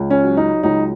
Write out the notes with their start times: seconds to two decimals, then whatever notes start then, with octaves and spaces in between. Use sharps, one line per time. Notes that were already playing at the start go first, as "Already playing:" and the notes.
Already playing: C#2
0.10 C#4
0.24 F#3
0.37 D#4
0.63 C#2 D#4